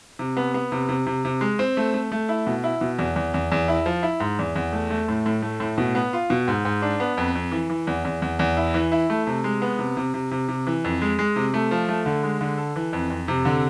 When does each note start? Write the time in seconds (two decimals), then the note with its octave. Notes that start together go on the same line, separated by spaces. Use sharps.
0.19 C3
0.37 B3
0.54 B3
0.72 C3
0.89 C3
1.06 C3
1.25 C3
1.41 G#3
1.59 C4
1.77 A3
1.94 A3
2.12 A3
2.29 E4
2.47 B2
2.64 E4
2.81 B2
2.98 E2
3.16 E2
3.34 E2
3.52 E2
3.68 E4
3.86 F3
4.03 E4
4.20 G#2
4.39 E2
4.55 E2
4.73 A3
4.90 A3
5.08 A2
5.26 A2
5.42 A3
5.60 A2
5.78 B2
5.95 B3
6.13 F4
6.30 B2
6.48 G#2
6.65 G#2
6.82 D4
7.00 B3
7.17 F2
7.35 F2
7.52 E3
7.70 E3
7.87 E2
8.05 E2
8.22 E2
8.39 E2
8.57 E4
8.74 E3
8.92 E4
9.10 A3
9.27 C3
9.44 G#3
9.62 B3
9.79 C3
9.97 C3
10.14 C3
10.31 C3
10.48 C3
10.67 E3
10.84 F2
11.02 G#3
11.19 G#3
11.36 C3
11.54 A3
11.71 F3
11.89 A3
12.06 D3
12.23 G#3
12.41 D3
12.58 A4
12.76 E3
12.93 F2
13.10 F2
13.28 C3
13.45 D3